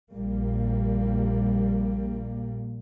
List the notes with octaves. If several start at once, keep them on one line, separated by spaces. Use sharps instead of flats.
A#1 A#2 G3 A#3